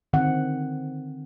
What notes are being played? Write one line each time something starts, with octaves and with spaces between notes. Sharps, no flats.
D3 D#3 C4 F#5